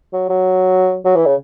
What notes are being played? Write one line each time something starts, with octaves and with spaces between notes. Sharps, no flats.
F#3
F#3
F#3
E3
C#3